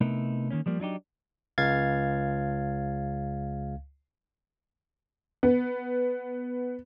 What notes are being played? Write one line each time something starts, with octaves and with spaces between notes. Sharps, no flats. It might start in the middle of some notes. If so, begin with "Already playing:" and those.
C3 A3 B3 D#4 E4 A#4
D#3 E3 A#3 C#4
F3 G3 A#3
F#3 D4 D#4 G4
C#2 F5 G#6 A6
B3